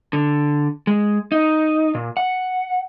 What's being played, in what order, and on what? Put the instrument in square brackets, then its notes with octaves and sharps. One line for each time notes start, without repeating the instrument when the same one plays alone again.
[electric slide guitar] D3
G#3
D#4
A#2
F#5